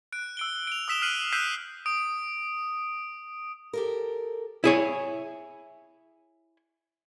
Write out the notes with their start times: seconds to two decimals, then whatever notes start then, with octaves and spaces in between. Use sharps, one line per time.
0.12 F#6 D7
0.37 E6 D7 G7
0.67 D7 F7
0.88 D#6 E6 B6 E7 F7 G7
1.02 F6 F#6 C7 D#7 F#7
1.33 E6 F#6 G6 B6 C7 D#7
1.86 D#6 D7
3.73 G4 A4 A#4
4.64 E4 G#4 C#5